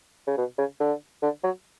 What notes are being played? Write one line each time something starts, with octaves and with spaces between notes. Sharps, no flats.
C#3
B2
C#3
D3
D3
F#3